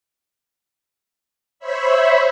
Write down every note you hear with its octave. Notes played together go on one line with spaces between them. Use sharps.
C5 C#5 E5 B5